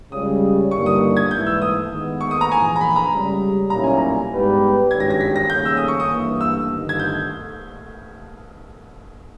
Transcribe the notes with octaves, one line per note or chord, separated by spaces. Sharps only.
C#2 C#3 G3 D#6
G1 G2 D#3 G3 A#3 C#6
D#6
G#6
G#2 E3 A#3 E4 G6
E6
D#6
D#3 G#3 B3
C#6
D#6
A#5
A#1 G#2 E3 G#5
A#5
B5
A#5
C#2 C#3 G3
B1 A#2 G3 C#4 E4 A#5
G#5
A#5
G#2 G3 B3 G4 B4
G#1 G2 G3 C#4 G4 G#6
A#6
A#6
B6
A#6
D#2 C#3 G3 C#4 G6
E6
D#6
C#6
D#6
G2 E3 A#3
E6
G1 G2 D#3
G#6
G6